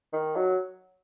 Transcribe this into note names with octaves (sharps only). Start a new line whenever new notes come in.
D#3
F#3